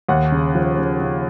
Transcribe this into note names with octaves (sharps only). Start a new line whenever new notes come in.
D#2 F#5
C#3
F3
C#3
C#3